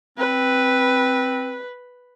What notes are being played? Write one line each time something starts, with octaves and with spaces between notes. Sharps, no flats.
C4 B4